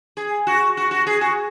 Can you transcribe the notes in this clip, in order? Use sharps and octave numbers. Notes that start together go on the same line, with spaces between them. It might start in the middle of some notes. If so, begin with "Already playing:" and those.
G#4
F#4
F#4
F#4
G#4
F#4